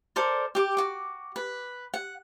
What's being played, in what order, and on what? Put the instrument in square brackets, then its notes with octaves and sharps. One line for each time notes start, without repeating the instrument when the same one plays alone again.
[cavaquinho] A4 A#4 C5 D5
G4 D6
F#4 D6
B4
F#5